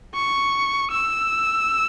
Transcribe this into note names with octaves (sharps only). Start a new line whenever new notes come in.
C#6
E6